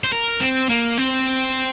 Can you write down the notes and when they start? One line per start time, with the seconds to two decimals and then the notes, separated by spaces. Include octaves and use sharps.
0.04 C5
0.13 A#4
0.41 C4
0.69 A#3
0.98 C4